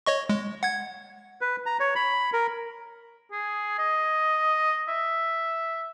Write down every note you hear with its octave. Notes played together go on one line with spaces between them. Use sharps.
C#5 D#5 C#6
G#3
F#5 G#6
B4
A#5
C#5
B5
A#4
G#4
D#5
E5